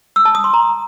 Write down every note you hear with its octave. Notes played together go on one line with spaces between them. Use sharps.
E6
A5
D#6
C6
A#5